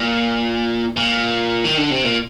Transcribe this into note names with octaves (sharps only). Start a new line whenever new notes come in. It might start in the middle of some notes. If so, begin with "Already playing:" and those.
Already playing: A#2
A#2
D#3
D3
C3
A#2